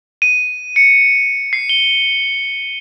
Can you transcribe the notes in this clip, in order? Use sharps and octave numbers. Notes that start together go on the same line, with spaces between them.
D#7
C#7
C7
G7